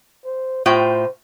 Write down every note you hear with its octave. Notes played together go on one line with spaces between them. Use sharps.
C5
A2 F4 C5 G5